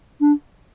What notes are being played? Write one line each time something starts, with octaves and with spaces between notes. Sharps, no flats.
D4